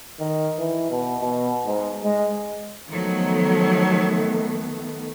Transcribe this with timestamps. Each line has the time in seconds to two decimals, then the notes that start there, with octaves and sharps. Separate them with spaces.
0.20 D#3
0.59 E3
0.90 B2
1.20 B2
1.66 G#2
2.04 G#3
2.89 D#3 F3 F#3 A3 B3